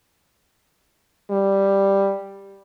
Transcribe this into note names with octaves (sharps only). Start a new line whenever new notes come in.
G3